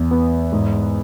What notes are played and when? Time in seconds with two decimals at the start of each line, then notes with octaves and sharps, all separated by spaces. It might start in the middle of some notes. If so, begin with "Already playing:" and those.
Already playing: E2
0.11 B3
0.52 G#2